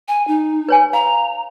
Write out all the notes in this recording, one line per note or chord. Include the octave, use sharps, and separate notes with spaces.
G#5
D#4
B4 C#5 G#5
F5 A#5